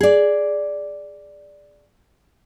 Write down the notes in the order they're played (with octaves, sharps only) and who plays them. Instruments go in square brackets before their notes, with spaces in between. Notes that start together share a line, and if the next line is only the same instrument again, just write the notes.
[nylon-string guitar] G#4 D5